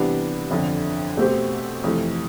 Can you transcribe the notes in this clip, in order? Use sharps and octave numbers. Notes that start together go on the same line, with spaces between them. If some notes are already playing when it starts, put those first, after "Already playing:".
Already playing: C3 E3 G3 B3 D4
G1 F2 D3
B2 A3 C4 G4 C5
F2 C3 E3 A3